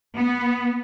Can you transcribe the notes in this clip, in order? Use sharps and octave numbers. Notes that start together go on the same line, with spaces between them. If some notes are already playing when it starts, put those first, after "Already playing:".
B3